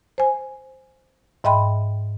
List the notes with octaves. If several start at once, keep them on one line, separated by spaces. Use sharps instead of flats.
C5 G#5
G#2 D#5 E5 G5 B5 C6